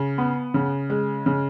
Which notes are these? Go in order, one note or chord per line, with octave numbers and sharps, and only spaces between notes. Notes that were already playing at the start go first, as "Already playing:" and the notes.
Already playing: C#3
B3
C#3
G#3
C#3